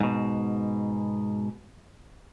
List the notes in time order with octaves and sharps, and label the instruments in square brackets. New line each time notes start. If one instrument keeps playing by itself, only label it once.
[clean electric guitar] G#2 B2